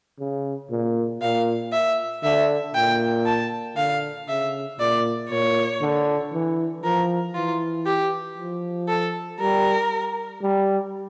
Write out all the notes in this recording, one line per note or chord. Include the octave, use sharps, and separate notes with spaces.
C#3
A#2
A#2 F5
E5
D3 E5
A#2 G5
A5
D3 F5
C#3 E5
A#2 D5
A#2 C#5
D3
E3
F3 A#4
E3 F4
G4
F3
A4
G3 A#4
G3